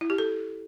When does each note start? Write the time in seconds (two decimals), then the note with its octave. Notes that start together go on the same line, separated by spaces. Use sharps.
0.01 E4
0.10 G4
0.18 A4